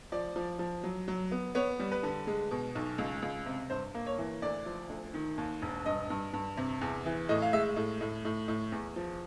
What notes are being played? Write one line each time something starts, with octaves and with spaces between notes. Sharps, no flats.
F3 D5
F3
F3
F#3
F#3
B3
B3 C#5
G3
B4
D3
G#3
B2
B1
C#2
C#2
C3
G2 C5
A#3
C#5
E3
D2 D5
F3
D2
D#3
D#2
E1
G2 D#5
G2
G2
C3
E2
E3
A2 D#5
F5
G#3 E5
A2
A2
A2
A2
E2
F3